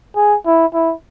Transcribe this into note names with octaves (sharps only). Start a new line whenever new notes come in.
G#4
E4
E4